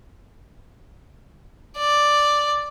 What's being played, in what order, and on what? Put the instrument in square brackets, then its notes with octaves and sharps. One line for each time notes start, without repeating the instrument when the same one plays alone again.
[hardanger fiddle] D5